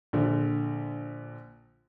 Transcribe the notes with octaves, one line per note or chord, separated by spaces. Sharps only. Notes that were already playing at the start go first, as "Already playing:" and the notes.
A#1 D3